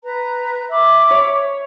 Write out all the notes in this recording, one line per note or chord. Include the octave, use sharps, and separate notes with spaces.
B4 A#5
E5 B5 D6
C#5